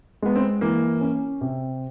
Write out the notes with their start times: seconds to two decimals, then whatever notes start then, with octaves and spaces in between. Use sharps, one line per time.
0.22 G#3 B3
0.36 C4
0.61 E3 A#3
1.01 C#4
1.41 C3